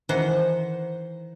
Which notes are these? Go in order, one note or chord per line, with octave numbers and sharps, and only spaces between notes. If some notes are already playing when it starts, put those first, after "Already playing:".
D#3 E3 C5 F#5